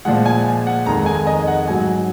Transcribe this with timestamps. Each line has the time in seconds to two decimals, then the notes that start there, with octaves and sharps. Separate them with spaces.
0.05 A#2 F3 G#3 F#5
0.26 G#5
0.67 F#5
0.86 F2 D#3 G#3 A#5
1.06 G#5
1.27 D#5
1.47 F#5
1.68 G#2 F#3 G#5